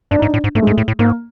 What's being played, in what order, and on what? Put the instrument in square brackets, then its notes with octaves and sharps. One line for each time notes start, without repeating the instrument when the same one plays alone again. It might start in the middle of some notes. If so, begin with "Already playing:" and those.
[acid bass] G2 [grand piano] D4
[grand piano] D#4
[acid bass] G#2
[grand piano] D4
[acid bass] A2
G#2
[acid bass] G#2 [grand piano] A3
[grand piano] G#3
[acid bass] G#2
[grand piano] A3
[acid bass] A2
A2
[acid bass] G#2 [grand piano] A#3